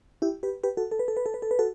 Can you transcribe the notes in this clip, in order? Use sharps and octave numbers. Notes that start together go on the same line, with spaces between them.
E4 G4
G4 B4
G4 B4
F#4 A4
A4
B4
A4
B4
A4
B4
A4
B4
F#4 A4